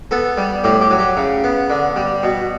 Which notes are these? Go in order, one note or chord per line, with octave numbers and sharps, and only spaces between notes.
B3 A4
G3
A2 G4
G4
F#3
G4
C#3
B3
D3
G3
B2